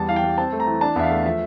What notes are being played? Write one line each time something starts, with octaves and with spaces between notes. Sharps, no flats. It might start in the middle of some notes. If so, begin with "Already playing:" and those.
Already playing: E2 G3 A5
E3 F5
G5
G3
C4 A5
A3
A#5
E3
D4 A5
E2 E5
F5
A3
F3 E5